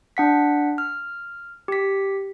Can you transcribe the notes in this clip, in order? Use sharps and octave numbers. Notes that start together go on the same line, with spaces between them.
D4 F#5 B6
F6
G4 B6